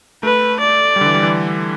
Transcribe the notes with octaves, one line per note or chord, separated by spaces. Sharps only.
A3 B4
D5
G3
D3
E3
G3
E3